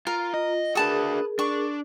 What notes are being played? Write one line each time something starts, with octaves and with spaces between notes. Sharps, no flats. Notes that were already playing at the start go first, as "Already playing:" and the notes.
F4 A#4
F4 D#5
D4 F#4 G#4 A#4 B4 A5 D#6
D4 C#6